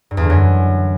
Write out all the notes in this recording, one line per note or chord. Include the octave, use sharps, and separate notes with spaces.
G2
E2
D3
F#2